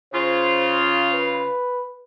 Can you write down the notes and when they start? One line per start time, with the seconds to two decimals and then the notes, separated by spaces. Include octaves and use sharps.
0.14 C#3 F4 C5
1.13 B4